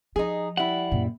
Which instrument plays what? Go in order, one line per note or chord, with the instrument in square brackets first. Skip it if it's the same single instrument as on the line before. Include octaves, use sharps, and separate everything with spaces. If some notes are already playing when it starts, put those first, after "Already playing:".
[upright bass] F3 [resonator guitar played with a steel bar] D#4 G#4
[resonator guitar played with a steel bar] G3 E4 [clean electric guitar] F#5
[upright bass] F#2 A#2